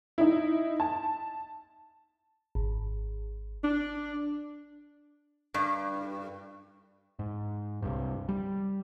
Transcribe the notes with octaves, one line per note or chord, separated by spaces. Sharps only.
D#4 E4
A5
G#1
D4
G2
G#2
C2 G2
G3